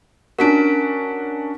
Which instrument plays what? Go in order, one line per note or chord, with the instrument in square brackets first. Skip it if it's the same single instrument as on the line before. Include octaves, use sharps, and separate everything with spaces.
[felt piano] C#4 D4 F#4 [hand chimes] A#4 B6 D7